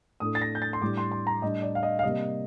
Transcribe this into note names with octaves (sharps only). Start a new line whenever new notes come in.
A2 A3 D4 D#6
A6
A#6
G6
A6
C6
A2 G3 D4 D6
C6
C6
A#5
A2 G3 D4 D#5
D5
F5
D#5
F5
C3 G3 A#3 D#5